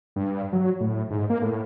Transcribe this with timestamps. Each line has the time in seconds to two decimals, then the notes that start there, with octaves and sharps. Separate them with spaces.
0.16 G2
0.53 F#3
0.80 A2
1.10 G#2
1.30 A#3
1.42 A2